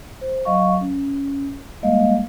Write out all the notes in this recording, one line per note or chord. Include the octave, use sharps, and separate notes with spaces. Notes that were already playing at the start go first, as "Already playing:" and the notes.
C5
F#3 D#5 F5 C#6
C#4
G3 G#3 A#3 D#5 F5